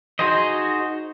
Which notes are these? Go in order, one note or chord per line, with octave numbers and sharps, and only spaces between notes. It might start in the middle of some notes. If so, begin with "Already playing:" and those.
D#4 F#4 G#4 C5 D#5